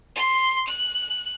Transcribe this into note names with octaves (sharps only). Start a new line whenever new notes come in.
C6
F#6